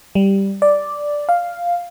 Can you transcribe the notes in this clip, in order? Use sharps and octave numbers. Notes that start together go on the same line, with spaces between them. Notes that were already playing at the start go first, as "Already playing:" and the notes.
G3
D5
F5